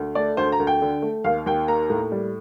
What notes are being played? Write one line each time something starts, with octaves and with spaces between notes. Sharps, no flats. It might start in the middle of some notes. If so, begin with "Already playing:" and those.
Already playing: D2
A3 D5
D2 C5
A#5
D2
G5
D3
A3
D#2 F5
D#2 G5
A#3 A#5
A2
G3